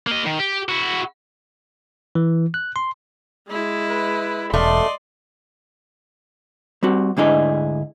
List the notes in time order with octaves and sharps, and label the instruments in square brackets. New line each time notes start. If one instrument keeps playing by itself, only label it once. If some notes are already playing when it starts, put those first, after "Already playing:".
[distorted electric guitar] A#3 D#5
D#3
G4
E4 F#4
[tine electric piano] E3
F#6
C6
[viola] G#3 E4
[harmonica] B4
[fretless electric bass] E1 [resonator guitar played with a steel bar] F#2 A3 [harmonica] D5 D#5 [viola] C6
[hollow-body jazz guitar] G3 C4 F#4
D2 G#2 D4 E4 G#4 D#5